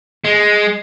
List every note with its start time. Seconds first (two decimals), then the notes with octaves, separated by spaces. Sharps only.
0.24 G#3